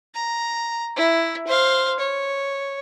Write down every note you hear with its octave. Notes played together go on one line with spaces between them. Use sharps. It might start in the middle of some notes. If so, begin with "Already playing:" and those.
A#5
E4
C5 F5
C#5